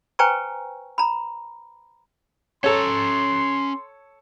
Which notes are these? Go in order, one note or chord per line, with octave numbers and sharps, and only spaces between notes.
B4 C5 G5 G#5 A#5 C#6
A#5 B5
C#4 A4 C#5 A#5 C6